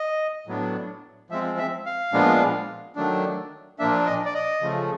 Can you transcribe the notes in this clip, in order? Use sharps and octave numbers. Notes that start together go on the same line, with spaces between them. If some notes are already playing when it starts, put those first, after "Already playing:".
Already playing: D#5
A2 F#3 B3 D4
F3 G#3 C4 E5
E5
F5
A#2 F3 G#3 B3 D4
D#3 F#3 A3 D4
A#2 F3 A#3 D4 E5
D#5
D5
D#5
C#3 F3 A3